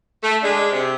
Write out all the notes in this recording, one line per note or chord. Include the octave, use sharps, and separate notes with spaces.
A3
G#3 D4
C3